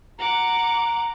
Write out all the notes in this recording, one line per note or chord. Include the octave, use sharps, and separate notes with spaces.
F#5 A#5 D6